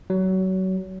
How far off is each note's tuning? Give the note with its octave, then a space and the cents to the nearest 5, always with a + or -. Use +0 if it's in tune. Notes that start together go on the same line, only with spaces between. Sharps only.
F#3 +25